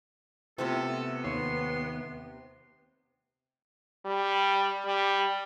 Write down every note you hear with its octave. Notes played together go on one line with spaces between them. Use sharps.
C3 A3 B3 F4 A4
D#2 C#5 C6
G3
G3